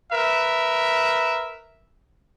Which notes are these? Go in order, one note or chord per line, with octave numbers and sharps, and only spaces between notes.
A#4 B4 E5